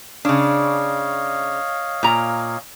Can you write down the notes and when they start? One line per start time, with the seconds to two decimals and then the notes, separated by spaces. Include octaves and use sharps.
0.25 C#3 D4 C#5 D#5 F5
2.03 A#2 A#5